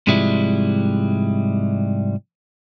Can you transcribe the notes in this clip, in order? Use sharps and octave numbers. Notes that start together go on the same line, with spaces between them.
G#2 C3 F3 G3 G#3 E4